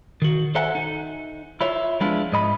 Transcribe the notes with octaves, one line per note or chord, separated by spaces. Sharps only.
D#3 F#4
A4 C5 E5 F#5 G#5 A#5
D#4
E4 F4 C#5 E5
F3 G#3 B3 D4 E4 F4
G#2 D#5 B5